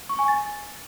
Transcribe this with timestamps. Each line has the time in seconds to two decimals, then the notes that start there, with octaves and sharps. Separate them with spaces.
0.09 C#6
0.19 G#5
0.28 A6